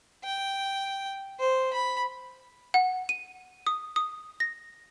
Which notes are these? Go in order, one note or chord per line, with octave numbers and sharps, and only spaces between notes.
G5
C5
B5
F#5
D#7
D#6
D#6
A#6